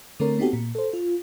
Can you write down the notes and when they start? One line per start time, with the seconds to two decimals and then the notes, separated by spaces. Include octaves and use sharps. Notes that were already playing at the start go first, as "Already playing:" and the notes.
0.20 D3 A3 C4 A#4 C#5
0.39 B3 C4 D#4 F#4 G4 A4
0.53 A#2
0.75 A4 C5
0.93 F4